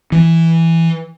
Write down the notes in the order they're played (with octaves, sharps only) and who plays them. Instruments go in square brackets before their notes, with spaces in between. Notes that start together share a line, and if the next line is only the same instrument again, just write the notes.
[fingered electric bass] E3